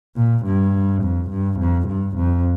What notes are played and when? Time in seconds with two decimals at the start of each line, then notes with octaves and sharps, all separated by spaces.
0.16 A#2
0.46 G2
1.03 F2
1.30 G2
1.60 F2
1.88 G2
2.17 F2